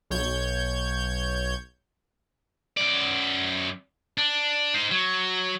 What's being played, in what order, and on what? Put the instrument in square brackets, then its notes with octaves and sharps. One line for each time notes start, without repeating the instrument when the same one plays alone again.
[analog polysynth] B1 C#5 G6 G#6
[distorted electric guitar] F#2 D5
D4
D#4 C5
F#3